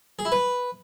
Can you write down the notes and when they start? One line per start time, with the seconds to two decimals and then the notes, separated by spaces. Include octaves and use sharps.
0.19 G#4
0.25 E4
0.32 B4